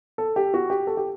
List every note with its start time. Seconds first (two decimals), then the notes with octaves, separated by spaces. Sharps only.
0.18 A4
0.36 G4
0.54 F#4
0.70 G4
0.87 A4
0.97 G4